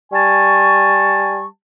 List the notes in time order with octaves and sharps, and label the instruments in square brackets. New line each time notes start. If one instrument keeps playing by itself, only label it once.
[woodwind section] G3 G#5 A5 C#6